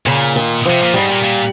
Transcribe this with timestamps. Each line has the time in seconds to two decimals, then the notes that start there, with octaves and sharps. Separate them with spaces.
0.06 A#2 C#3
0.36 D#3
0.66 C3 F3
0.82 A#2
0.94 G#2 G3
1.09 A#2
1.23 A#2